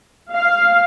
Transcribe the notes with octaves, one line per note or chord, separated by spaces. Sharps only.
F5